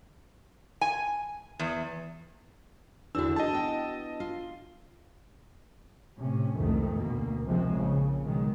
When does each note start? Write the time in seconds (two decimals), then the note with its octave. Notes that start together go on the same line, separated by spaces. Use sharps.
0.81 G#5
1.59 E2
3.15 E2 D3 D4 E4 F#4 E6
3.36 D#4 G#4 D#5 A5
3.53 B3 G5
4.20 F4
6.19 A2 C3 C#4
6.56 C2 F2 G#2 D#3 A3
6.93 D2 B2 A#3
7.45 A#1 C3 F3 G#3 C4 C#4
7.74 A#1 C#3
8.24 B2 D#3 F#3 G#3